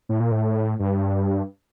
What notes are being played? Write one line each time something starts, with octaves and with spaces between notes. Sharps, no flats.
A2
A#2
A2
G2